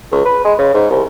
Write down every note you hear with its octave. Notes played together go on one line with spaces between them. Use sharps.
C#2
B4
G#3
C#3
G#2
C2